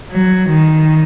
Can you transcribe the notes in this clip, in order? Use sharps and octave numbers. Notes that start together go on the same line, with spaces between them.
F#3
D#3